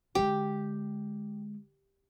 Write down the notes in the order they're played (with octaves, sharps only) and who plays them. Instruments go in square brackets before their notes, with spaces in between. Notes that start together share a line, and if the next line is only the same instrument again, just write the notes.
[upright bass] D3 G#3 [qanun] G4